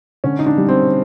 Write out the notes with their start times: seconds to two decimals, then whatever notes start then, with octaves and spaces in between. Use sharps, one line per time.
0.24 D3 C#4
0.39 D#4
0.46 D4
0.58 G3
0.69 C4